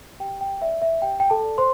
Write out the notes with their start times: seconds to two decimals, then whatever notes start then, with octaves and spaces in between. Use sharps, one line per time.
0.20 G4 G5
0.41 G5
0.61 D5 E5
0.82 E5
1.02 G4 G5
1.20 G5
1.30 A4 A5
1.43 D5
1.58 C5 C6